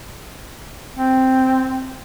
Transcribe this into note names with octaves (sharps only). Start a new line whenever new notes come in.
C4